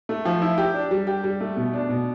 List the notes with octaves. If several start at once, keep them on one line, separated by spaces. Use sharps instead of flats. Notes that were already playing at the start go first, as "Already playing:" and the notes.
A3
F3
E4
G4
D4
G3
G4
G3
A3
B2
D4
B2